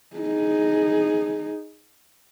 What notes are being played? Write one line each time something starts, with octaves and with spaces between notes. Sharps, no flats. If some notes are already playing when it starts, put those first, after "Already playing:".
D#4 G#4